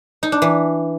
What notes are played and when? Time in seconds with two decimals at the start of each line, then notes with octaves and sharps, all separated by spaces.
0.23 D#4
0.32 D4
0.42 E3